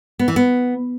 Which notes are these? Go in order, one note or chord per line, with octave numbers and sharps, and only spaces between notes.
B3
E3
B3